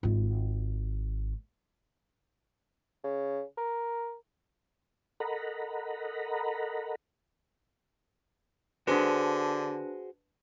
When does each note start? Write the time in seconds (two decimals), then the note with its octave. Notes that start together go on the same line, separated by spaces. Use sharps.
0.03 G#1 F4
3.04 C#3
3.58 A#4
5.20 A4 A#4 D#5 F#5 A#5 B5
8.87 D3 D4 F#4 G#4 B4 C5